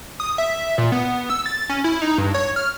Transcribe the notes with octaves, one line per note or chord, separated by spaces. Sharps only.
D#6
E5
A#2
B3
E6
A6
C#4
E4
D#4
G2
C#5
F6